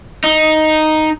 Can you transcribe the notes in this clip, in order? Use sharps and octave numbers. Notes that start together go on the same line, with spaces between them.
D#4